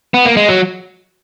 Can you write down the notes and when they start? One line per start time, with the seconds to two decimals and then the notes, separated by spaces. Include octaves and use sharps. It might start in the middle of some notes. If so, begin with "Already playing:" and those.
0.14 B3
0.25 A#3
0.37 G#3
0.48 F#3